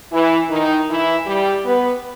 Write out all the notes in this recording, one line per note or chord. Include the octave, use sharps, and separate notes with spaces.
E3 E4
D#3 D#4
E3 E4
G3 G4
B3 B4